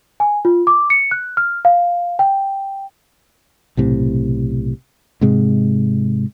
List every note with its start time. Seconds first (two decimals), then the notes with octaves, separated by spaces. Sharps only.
0.20 G#5
0.45 F4
0.67 D6
0.90 C#7
1.11 F#6
1.37 F6
1.65 F5
2.19 G5
3.77 B1 A2 C3
5.21 G#2 C3 G#3